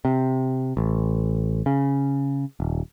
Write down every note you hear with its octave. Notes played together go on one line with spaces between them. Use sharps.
C3
A1
C#3
D#1